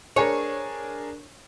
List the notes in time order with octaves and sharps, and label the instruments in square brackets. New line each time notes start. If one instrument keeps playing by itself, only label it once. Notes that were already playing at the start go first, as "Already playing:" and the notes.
[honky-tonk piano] D4 G#4 A#4 [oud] C#5